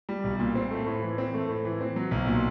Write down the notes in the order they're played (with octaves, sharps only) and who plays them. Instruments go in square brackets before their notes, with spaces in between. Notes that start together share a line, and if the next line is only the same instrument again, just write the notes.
[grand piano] G3
B1
A#2
C4
A3
A2
E3
C4
A3
A2
E3
C4
F#3
B1
A#2